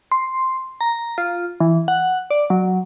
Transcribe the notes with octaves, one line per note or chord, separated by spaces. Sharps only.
C6
A#5
F4
E3
F#5
D5
F#3